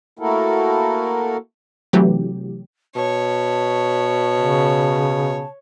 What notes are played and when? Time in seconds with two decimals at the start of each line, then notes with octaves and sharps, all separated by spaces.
0.19 A3 A#3 E4 F#4 A4 A#4
1.93 C3 E3 F#3 A3 G4
2.96 B2 C#5 A5
4.37 C#3